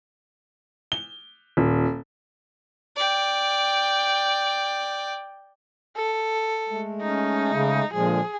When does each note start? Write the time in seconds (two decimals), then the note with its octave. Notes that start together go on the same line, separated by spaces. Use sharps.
0.92 G7
1.57 D#1
2.96 D5 G5
5.96 A4
6.69 G#3 A3
7.02 C#4 D#4
7.54 C#3
7.93 A#2 D3 F3 G#3 G#4